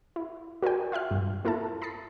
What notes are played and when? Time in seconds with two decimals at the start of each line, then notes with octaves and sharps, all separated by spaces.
0.16 E4
0.62 F#4 A#4 C5 D5 G5
0.92 F4 E5 G5 F6
1.11 G2
1.45 A#3 E4 F4 A4 E5 A5
1.82 A#5 B5 D#6 A6 B6 C7